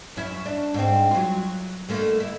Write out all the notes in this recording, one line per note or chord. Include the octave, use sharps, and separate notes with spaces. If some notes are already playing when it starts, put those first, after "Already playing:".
F#2 C#4 E4
D4
G#2 C4
F#3 F4
D3 A3 A#3
E4